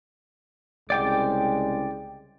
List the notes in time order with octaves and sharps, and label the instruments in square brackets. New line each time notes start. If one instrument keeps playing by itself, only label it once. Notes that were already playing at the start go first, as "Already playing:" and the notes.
[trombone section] C2 C#3 G#3 [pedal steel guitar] D5 G5 D6